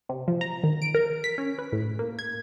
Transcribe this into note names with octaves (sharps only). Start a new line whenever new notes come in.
C3
F3
A#5
D#3
D7
A#4
B6
C#4
B4
A2
A#3
G#6